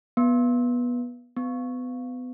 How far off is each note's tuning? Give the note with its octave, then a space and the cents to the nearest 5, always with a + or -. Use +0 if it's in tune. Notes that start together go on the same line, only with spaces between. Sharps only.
B3 -15
B3 +30